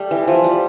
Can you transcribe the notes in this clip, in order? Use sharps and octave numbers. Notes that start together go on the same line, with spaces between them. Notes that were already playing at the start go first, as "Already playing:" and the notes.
Already playing: G3 A3
E3
F3
G3